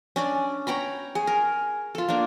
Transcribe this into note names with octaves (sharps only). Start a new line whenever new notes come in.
C#4 D4 D5
C#5 G5 A#5 B5
G#4
A#4
F4 A4
A#3 D4